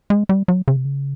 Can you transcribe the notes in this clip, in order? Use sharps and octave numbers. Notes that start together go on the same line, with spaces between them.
G#3
G3
F#3
C#3
C3
C#3